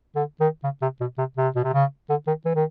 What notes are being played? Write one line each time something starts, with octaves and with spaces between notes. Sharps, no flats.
D3
D#3
C#3
C3
B2
C3
C3
B2
C3
C#3
D3
D#3
E3
D#3